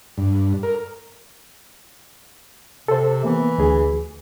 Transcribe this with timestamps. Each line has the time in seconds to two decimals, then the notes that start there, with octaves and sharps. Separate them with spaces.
0.18 G2
0.63 A#4
2.88 C3 A4 C5
3.24 E3 A#3 B3
3.58 D2 G#4